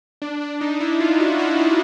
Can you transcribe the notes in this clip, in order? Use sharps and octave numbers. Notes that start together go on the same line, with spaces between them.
D4
D4
D#4
E4
F4
F#4
E4
D#4